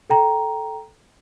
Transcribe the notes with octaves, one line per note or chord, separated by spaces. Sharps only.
A4 G5 A#5